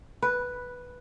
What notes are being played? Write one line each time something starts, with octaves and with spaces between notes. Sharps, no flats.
B4